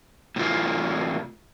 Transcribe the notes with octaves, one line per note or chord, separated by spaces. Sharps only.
A2 C3 E3 F4